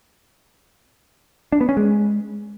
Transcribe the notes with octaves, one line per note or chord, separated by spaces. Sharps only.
D4
B3
C#4
G#3